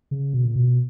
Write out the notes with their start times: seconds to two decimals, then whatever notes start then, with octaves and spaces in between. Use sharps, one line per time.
0.11 C#3
0.33 B2
0.45 A#2
0.56 B2